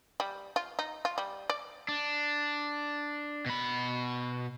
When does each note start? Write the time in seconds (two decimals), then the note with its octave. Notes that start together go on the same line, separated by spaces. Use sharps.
0.20 G3
0.56 F4
0.79 D#4
1.05 F4
1.18 G3
1.50 D5
1.88 D4
3.46 B2 B5